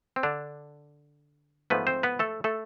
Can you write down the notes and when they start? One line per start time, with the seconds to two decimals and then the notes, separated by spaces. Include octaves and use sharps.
0.16 C4
0.23 D3 D4
1.70 G#2 F3 A3 B3 B4
1.87 C4 C5
2.03 B3 B4
2.19 A3 A4
2.44 A3 A4